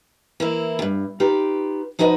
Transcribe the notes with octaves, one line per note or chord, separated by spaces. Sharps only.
E3 A#3 E4
E2 G2
D#4 F4 G4 B4
F3 D#4 F#4 B4 D#5